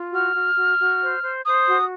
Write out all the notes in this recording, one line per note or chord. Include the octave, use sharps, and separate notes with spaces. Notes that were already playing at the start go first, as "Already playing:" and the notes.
Already playing: F4
F#4 F6
F#4
F#4
F#4
C5
C5
C5 D#6
F#4